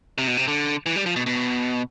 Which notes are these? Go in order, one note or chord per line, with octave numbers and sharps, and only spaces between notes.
C3
B2
C3
D3
E3
G3
F3
B2
B2